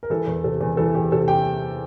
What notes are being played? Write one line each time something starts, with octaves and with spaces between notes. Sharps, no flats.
A#4
E3 A4
E2
C3 A4
E2
E3 A4
E2 G4
C3 A4
G4 G5